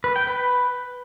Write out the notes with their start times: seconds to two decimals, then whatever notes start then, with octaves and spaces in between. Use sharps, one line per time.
0.04 B4
0.16 G5
0.27 B4